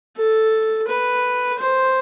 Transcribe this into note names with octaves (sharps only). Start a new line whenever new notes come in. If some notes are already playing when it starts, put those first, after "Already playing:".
A4
B4
C5